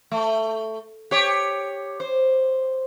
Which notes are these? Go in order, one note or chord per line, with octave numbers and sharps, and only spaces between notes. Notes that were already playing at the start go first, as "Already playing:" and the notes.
A3
G4 C#5
C5